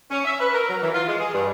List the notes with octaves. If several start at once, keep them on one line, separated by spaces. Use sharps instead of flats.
C#4
E5
B4
A#4
F#3
E3
F4
G#3
G#4
G2